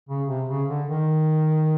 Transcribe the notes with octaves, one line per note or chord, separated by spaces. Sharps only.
C#3
C3
C#3
D3
D#3